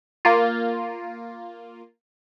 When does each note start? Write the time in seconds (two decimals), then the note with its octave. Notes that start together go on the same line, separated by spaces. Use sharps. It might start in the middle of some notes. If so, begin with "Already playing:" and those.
0.25 A#3 F4